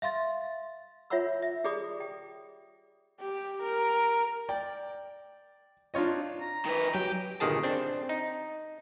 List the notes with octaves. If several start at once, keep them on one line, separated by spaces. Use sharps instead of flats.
E5 F5 C6 A6
F4 C#5 E5 F#5 B5 E6
E5
G4 G#4 D5 B5 D#6
G5
G4
A#4
D5 G5
D4 D#4 F4 C#5 D#5
A#5
D#3 B4
F#3 G4 G5
G1 G2 A#2 D#3 G#4 A5
C4 D4
D#4